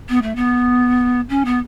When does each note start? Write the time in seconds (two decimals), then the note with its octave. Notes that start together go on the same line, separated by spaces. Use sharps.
0.09 B3
0.22 A3
0.36 B3
1.30 C#4
1.45 B3